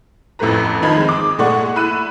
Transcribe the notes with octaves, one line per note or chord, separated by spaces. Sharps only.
A1 F2 A2 A3 B4 A#5
D#3 F3 D#4 B5 G#6
G#3 C4
D6 D#6
A#2 G#3 A3 D5 F#5 C#6
E4 B5 F#6 D#7